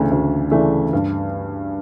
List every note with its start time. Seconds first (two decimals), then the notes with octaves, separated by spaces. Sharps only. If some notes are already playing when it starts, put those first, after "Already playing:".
Already playing: D2 C#3 E3 A3 D4
0.11 D2
0.51 C#3 E3 A3 D4
0.93 G2